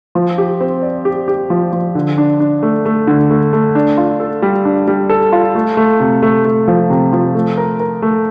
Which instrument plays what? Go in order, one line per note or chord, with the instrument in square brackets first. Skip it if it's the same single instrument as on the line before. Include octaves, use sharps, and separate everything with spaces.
[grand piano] F3
G4
C4
D5
G4
G4
F3
F3
D3
D4
D4
A3
A3
D3
A3
A3
D4
F4
A4
G3
D4
G3
A4
F4
A3
A3
C3
A3
A3
F3
C3
F3
A3
A#4
A#4
A3